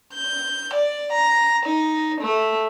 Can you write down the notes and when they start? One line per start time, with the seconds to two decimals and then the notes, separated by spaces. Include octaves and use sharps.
0.14 G6
0.74 D5
1.13 A#5
1.66 D#4
2.21 A3